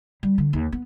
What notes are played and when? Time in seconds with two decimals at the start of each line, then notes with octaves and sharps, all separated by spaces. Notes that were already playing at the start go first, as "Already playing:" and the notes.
0.23 G3
0.38 D3
0.53 D#2
0.72 B3